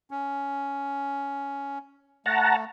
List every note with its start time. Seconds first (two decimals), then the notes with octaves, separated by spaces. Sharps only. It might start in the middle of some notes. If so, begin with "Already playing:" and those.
0.11 C#4
2.26 A3 F#5 A5 A#5